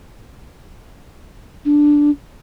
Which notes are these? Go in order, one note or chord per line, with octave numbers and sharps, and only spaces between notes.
D4